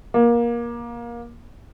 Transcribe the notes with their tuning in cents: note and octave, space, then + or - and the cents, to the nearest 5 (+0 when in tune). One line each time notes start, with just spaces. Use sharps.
A#3 +25